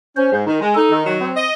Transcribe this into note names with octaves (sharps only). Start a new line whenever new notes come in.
C#4 C5
G#2
D#3
G#3
D#4 A4
D#3
F#3
C4
D#5